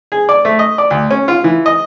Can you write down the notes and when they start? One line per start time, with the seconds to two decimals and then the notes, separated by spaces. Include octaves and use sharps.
0.12 G#4
0.29 D5
0.45 A3
0.59 D#5
0.78 D5
0.90 D2
1.11 C#4
1.28 F4
1.44 E3
1.66 D#5